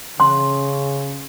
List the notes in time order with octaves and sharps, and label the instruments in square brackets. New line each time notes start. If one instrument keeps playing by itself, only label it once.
[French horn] C#3 [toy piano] C6